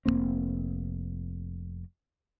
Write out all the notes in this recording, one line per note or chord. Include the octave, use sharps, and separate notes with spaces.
F1 G2 A#3 C4